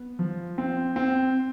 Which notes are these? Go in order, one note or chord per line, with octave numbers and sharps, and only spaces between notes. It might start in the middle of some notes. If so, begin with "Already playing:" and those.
Already playing: B3
F3
C4
C4